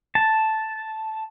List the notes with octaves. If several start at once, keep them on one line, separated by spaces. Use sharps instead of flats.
A5